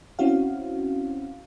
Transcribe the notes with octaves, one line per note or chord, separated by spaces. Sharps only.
C4 C#4 E4 F#4 F5